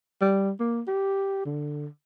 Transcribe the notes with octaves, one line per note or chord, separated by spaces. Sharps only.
G3
A#3
G4
D3